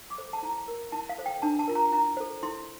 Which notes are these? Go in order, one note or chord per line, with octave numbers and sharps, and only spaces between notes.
D6
A4 C5
A5
E4 A#5
A#4
E4 A5
F5
A4 C5
G5
D4 A5
A5
F4 A#4
A#5
E4 A#5
A4 C5
E4 C6